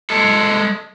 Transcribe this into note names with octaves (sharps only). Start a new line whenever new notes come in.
G#3 A4